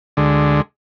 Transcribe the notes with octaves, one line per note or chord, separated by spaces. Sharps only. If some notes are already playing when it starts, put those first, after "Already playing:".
D2 D3 G#3